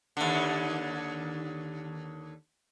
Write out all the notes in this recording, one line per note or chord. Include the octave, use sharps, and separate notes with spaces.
D#2 D3